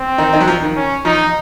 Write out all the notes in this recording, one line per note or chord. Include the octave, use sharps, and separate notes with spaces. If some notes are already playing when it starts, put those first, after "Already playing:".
Already playing: C4
D#3 D#4
D#3 D#4
F#3
F3
D#3
C#4
F3 D#4